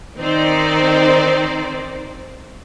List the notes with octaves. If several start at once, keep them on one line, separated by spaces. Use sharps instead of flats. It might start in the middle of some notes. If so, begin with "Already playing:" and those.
D#3 C4 D#4 C5 D5